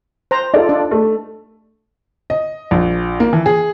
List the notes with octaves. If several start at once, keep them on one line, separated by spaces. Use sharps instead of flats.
C5 A#5
D#4 F4 A4 D5
D4
A3
D#5
A#1
A#3
E3
G#4